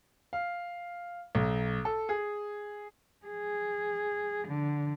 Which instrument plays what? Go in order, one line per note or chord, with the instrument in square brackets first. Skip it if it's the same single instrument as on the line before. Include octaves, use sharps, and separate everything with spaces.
[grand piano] F5
B1
A4
G#4
[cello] G#4
D3